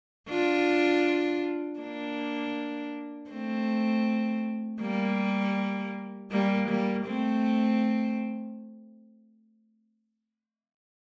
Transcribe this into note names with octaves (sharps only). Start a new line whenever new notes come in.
D4 F4
A#3 D4
A3 C4
G3 A#3
G3 A#3
G3 A#3
A3 C4